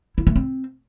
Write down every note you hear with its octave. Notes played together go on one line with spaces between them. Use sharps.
E4
A3
C4